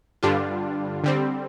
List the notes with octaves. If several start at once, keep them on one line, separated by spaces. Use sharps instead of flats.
G2 D3 G3 D4 F4
D3 G3 C4